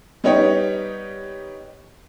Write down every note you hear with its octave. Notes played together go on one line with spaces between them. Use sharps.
G3 B3 D#4 G4 C#5